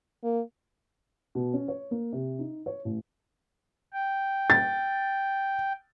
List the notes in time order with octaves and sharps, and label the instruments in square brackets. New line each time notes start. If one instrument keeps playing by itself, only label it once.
[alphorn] A#3
[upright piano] B2
C#4
C#5
A#3
C3
D#4
C#5
A1
[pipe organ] G5
[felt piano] A6